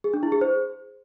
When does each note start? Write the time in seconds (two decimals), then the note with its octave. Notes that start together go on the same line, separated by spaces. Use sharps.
0.04 G#4
0.14 D4
0.23 E4
0.32 G#4
0.41 C5